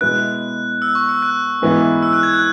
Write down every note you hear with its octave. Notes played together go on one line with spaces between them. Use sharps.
B2 G#3 B3 E4 F#6
E6
C#6
E6
F#6
G#2 E3 B3 E4
E6
F#6
G#6
F#6